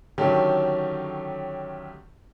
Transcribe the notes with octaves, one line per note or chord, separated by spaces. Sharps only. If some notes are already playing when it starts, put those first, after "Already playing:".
D3 D#3 F#3 A3 C#4 G4